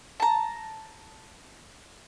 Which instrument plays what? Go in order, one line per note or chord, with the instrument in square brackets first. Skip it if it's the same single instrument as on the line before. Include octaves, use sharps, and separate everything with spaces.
[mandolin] A5 A#5